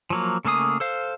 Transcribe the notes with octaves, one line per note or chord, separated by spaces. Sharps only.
F3 F#3 A#3
C#3 A3 A#3 G#4 D#6
A4 C5 F5